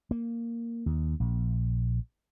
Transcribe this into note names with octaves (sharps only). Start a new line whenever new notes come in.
A#3
D#2
A#1